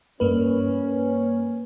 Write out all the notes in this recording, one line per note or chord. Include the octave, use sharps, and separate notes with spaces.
G2 A#3 C#4 B4